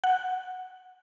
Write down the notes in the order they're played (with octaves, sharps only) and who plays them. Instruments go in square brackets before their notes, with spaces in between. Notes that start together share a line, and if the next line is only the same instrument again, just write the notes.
[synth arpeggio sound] F#5